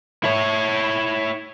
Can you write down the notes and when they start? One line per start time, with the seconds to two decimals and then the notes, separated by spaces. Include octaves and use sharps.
0.24 E4 C#5